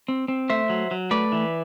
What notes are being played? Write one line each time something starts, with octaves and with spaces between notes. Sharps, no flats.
C4
C4
A3 C5 E5
F#3
F#3
A3 B4 D5
E3